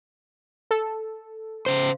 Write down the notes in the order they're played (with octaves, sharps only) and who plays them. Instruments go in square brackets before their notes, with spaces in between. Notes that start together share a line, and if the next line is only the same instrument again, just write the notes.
[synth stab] A4
[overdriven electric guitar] C#3 C5